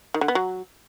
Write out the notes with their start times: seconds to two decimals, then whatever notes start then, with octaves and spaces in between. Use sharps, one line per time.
0.14 D#3
0.21 D3
0.28 B3
0.35 F#3